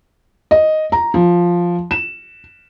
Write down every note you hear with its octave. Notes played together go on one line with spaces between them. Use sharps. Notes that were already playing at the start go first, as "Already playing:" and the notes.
D#5
A#5
F3
E7